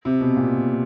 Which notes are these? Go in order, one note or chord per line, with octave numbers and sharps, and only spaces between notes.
C3
B2
A#2